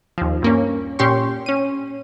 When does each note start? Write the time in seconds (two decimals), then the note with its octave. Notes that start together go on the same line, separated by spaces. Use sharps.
0.18 D#2 F3
0.42 G2 A#3 C#4
0.99 A#2 C#4 G4 C6 C#6
1.46 C#4 D#7